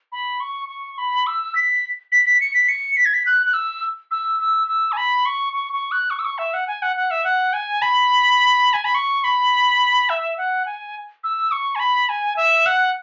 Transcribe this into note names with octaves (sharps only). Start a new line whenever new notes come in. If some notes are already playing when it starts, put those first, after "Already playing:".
B5
C#6
C#6
B5
E6
B6
B6
B6
C#7
B6
C#7
B6
G#6
B6
F#6
F#6
E6
E6
E6
E6
G#5
B5
C#6
C#6
C#6
F#6
C#6
E6
C#6
E5
F#5
G#5
F#5
F#5
E5
F#5
G#5
B5
G#5
B5
C#6
B5
E5
F#5
G#5
E6
C#6
G#5
B5
G#5
E5
F#5